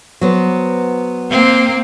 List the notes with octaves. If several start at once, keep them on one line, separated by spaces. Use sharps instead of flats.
F#3 B3 C5
A#3 C4